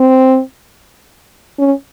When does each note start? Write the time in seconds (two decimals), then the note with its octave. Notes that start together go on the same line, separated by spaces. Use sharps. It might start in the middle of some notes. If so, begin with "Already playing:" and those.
Already playing: C4
1.59 C#4